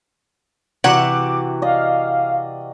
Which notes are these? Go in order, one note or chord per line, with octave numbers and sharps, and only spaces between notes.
C3 E3 F#4 F#5 D6
D5 D#5 F5